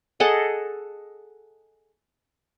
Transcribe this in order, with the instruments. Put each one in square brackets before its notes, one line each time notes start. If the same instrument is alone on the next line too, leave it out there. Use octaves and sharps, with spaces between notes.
[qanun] G#4 A4 D#5 F#5